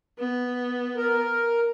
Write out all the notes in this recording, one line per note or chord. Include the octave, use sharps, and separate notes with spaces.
B3
A#4